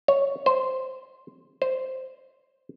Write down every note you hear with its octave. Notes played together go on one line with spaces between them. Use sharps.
C#5
C5
C5